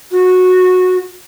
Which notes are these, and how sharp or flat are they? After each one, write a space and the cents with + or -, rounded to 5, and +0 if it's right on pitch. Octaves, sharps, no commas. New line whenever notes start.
F#4 -15